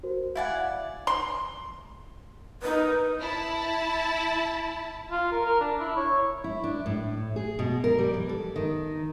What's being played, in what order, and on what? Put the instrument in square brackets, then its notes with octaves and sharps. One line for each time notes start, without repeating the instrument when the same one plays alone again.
[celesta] F#4 A#4 C5
[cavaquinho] E4 D5 F#5 [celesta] F5 G#5 G#6
[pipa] C6
[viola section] D#4 A#4 [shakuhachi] B4
[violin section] E4 A5
[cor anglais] F4
A#4
A#4
D4
E4
C#5
[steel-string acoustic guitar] E4
D4
A2
G#4
B2
A#4
G3
E3
A4
D#3